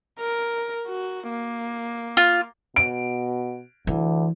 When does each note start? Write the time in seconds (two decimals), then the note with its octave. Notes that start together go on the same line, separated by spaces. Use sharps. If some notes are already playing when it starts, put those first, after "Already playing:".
0.20 A#4
0.87 F#4
1.30 A#3
2.17 F4
2.76 B2 D7
3.87 D2 E3